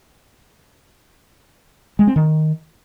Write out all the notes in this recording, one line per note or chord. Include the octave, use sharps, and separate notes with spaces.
G#3
C4
D#3